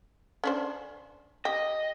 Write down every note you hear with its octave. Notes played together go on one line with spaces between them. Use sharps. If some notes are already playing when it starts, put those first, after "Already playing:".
C#4 D4 C5
G4 D#5